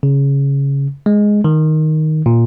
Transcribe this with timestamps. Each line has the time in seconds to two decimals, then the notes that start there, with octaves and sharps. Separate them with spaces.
0.03 C#3
1.06 G#3
1.44 D#3
2.26 A#2